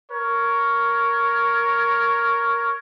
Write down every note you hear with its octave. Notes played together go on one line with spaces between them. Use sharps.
A#4 C#5